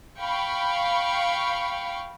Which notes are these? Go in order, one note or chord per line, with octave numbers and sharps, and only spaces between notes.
F5 G5 B5 C#6